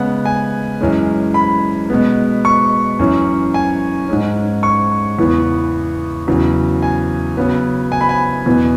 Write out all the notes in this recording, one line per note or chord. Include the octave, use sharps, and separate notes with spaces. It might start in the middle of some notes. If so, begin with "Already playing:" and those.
Already playing: C#3 G#3 B3 F#5
G#5
F#2 E3 G#3 C#4
B5
B2 G#3 B3
C#6
F#2 E3 C#4
G#5
G#2 G#3 C#4
C#6
E2 C#3 E3 B3
E2 C#3 F#3 C#4
G#5
C#3 F#3 B3
G#5
B5
G#5
E2 B2 B3